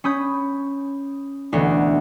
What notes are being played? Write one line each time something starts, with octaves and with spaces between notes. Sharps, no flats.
C#4 B5 D#6 G6
E1 D2 E3 B3